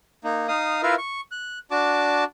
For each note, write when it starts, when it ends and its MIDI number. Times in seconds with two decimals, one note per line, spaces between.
0.24 0.48 58
0.24 0.48 63
0.48 0.81 63
0.48 0.81 77
0.48 0.81 87
0.83 0.95 64
0.83 0.95 65
0.83 0.95 70
0.83 0.95 71
0.83 0.95 76
0.83 0.95 77
0.98 1.21 85
1.31 1.59 90
1.71 2.24 62
1.71 2.24 66
1.71 2.24 81
1.71 2.24 86